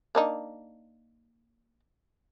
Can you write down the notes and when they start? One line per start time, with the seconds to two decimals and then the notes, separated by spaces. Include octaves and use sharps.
0.15 A#3 D4 D#4